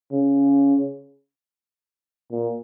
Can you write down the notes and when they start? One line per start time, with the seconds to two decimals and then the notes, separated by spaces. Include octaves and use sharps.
0.12 C#3
2.31 A#2